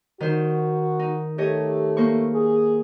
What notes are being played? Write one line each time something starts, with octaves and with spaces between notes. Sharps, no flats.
D#3 F#4 C5
D#4
A3 G4 C#5 D#5
A#3 C5 C#6
G#4